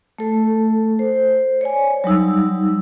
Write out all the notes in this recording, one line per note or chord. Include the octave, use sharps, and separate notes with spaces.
A3 A4
C5
C#5 D5 G#5
F#3 G3 D#4 E6